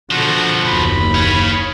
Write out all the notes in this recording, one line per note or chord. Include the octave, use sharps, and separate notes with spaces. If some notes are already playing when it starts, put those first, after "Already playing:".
B2 D3 F3 F#4
F#1 D#2 B5
C#5 F5